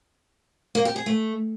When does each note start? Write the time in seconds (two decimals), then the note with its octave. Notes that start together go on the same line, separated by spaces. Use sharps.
0.75 A#3
0.85 G4
0.96 G#4
1.06 A3